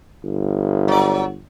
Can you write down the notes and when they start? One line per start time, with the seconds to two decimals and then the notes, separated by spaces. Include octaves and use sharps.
0.24 G1
0.88 F#3 D5